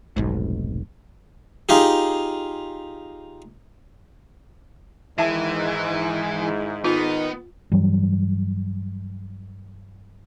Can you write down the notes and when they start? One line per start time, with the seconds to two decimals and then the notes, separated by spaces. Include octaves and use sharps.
0.16 F1 B1 G#2
1.69 D#4 F4 G4 G#4
5.18 G#2 D#3 E3 G#3 E4 E5 A5
6.84 D#3 B3 D#4 F4
7.72 G2 E3 F#3 G3